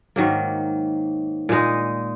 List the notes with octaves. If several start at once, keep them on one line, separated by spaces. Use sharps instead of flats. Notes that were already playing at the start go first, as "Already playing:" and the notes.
G#2 D#3 F#3 A#3
A#2 G#3 D#4